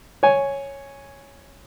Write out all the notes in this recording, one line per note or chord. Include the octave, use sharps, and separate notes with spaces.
C#5 G#5